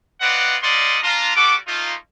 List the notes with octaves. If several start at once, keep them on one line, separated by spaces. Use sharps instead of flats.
C4 F4 B4 D5 D#5 F#5
G3 A#3 D5 D#5 F#5 C6
D4 F4 A#5
G3 B3 F#4 A4 D6
A3 A#3 D#4 F4